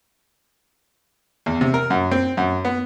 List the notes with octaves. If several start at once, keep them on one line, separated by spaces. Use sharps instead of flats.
E2
C3
A#4
F#2
C4
F#2
B3